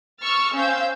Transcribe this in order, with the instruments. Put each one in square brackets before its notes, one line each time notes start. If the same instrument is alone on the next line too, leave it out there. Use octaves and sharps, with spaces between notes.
[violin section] C#6 E6 F6 A6
C4 C#4 F5 E6 G6